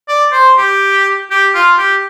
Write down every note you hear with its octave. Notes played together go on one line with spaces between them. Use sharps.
D5
C5
G4
G4
F4
G4